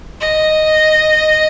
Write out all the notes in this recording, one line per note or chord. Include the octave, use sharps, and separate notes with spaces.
D#5